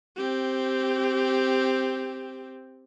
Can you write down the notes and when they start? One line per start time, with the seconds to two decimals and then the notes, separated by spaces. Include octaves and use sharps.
0.16 C4 G4